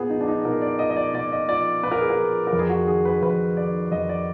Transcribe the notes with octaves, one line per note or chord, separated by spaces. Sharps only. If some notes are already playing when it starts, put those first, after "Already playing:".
Already playing: A#2 B3 G#4
F3 D#4
D4
D#4
A#2 A#4
D5
F3 D#5
D#5
D5
A#2 D5
D#5
F3 D5
A#2 B4
A#4
G#4
A#4
F3
A#4
F2
G#4
F#4
D#3 G#4
B4
F2 B4
D#3 D5
F2 D#5
D5